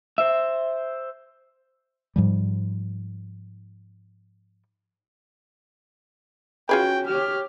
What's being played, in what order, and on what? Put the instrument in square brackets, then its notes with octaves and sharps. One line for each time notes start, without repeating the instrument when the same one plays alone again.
[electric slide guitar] C5 E5
[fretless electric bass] G#2 F3 G3
[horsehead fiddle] C#4 F#4 [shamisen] F4 G#4 B4 [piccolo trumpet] G5
[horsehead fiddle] G4 C#5 [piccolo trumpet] F6